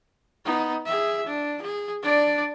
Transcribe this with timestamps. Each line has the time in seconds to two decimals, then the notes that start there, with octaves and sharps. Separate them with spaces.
0.45 B3 D#4
0.86 G#4 E5
1.26 D4
1.62 G#4
2.03 D4 D5